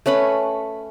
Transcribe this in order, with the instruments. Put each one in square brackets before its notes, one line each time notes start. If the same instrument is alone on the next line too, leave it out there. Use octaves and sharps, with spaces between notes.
[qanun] A3 C#4 B4 B5